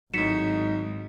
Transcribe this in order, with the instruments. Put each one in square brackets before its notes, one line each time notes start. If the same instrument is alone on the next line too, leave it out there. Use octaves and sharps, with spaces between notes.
[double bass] G#1 [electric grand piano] A2 F#3 [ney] D#4 [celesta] B6 C#7 E7